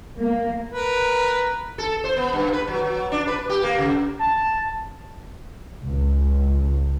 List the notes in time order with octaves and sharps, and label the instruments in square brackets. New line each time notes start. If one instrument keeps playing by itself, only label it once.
[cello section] A#3
[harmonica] A#4 B4
[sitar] A4
C5
B3
G2
B4
F#3
F#3
D4
B4
G4
A#3
C#3
[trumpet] A5
[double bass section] C#2